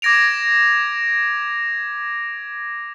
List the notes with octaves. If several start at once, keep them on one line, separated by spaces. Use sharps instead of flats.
D6 G#6 A#6 D7 F7